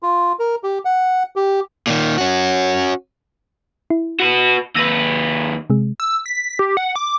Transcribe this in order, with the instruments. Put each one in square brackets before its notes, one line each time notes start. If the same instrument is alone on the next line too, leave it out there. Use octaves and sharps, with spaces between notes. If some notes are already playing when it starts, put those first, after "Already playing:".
[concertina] F4
A#4
G4
F#5
G4
[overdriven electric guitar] A#2 D#3
C#4 F#4
[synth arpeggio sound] E4
[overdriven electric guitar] F#4 B4
[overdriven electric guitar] D#2 B4 [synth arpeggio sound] E6 A#6 D#7
[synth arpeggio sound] C3 G#3
[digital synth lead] E6
B6
G4
F#5
D6